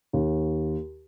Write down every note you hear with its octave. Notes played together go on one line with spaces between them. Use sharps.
D#2